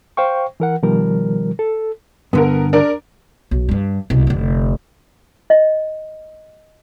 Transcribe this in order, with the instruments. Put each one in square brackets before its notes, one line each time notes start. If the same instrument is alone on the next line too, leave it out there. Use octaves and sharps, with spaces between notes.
[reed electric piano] C5 F5 G5 C#6
E3 A#4 F#5
B2 D#3 F3 G3 A#4
A4
[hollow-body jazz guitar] G2 D3 [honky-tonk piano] B3 A#4
[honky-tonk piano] D4 A#4
[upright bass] B1
G2 G3
C2 B2
F1 D3
[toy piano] D#5